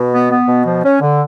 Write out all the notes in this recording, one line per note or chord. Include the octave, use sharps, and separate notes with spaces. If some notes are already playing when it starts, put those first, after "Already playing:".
Already playing: B2
B3
B3
B2
F3
C#4
D3